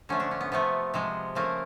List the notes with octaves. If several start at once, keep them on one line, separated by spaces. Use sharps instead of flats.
D3 F3 A3 C#4
D4
C#4
B3
C3 F3 A3 B3
C3 F3 G#3
C#3 F3 A3 A#3